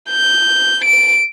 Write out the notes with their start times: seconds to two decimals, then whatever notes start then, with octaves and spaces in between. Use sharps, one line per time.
0.11 G6
0.85 D7